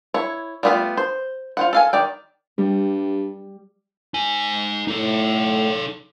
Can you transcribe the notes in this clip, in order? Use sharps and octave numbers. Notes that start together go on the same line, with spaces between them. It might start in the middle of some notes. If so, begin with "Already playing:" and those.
E4 C#5
G3 A3 B3 D#4 F4
C5
F4 C5 F#5
A4 F5 G#5
D#3 D5 G5
G2 G3
D#4 G#5
A2 D#4 A4